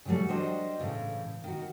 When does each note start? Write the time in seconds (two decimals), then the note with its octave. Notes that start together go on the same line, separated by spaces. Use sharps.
0.05 C#3 E3 F#3 G3 A3
0.28 G3 D4 F#4 C5 D#5
0.79 A2 C#3 E3
1.44 D#3 F#4